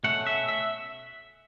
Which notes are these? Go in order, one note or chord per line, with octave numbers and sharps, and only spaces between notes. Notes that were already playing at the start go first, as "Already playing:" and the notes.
B2 A3 C#4 F#5
E5
E5